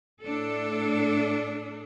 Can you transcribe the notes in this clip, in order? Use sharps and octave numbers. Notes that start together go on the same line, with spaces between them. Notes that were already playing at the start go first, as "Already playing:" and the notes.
A2 D4 A4